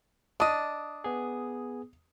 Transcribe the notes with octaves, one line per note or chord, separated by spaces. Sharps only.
D4 D#5 D#6
B3 G#4